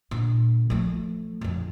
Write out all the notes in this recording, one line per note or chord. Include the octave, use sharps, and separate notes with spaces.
A#2 D3
F3 A3
F2 D3